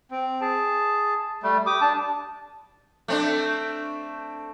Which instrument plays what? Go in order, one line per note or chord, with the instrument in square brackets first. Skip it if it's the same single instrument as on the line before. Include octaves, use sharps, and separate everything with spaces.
[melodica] C4
G#4 A5
G3 A3
G4 D6 D#6
D4 A5
[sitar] A3 C4 D4